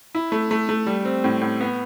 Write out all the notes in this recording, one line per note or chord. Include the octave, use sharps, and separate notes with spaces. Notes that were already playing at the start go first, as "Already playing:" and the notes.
E4
A3
A3
A3
G3
C4
A2
A2
B3